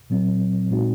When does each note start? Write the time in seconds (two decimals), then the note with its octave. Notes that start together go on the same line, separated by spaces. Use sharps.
0.10 A#2 F#3 C4
0.71 A#2 G#3 C4 D#4 F#4